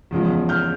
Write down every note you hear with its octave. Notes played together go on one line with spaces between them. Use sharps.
E2 C#3 F3 G#3
F6 G6